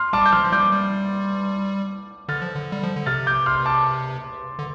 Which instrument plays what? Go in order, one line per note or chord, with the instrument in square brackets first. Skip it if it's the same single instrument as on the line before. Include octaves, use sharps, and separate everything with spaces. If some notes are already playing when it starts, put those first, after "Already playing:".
Already playing: [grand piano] C6 F6
[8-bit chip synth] G3 [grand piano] A5 D6
[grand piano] G6
[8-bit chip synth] F3 [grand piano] C6 F6
[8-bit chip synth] F3
[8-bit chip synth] G3 [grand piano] D6 G6
[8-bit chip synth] G3
[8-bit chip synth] D3 [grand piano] F6 A6
[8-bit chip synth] F3
D3
G3
F3
D3
[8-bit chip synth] C3 [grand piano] F6 A6
[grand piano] D6 G6
C6 F6
A5 D6
[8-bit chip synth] D3